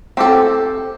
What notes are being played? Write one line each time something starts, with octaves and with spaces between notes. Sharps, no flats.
C4 G4 A4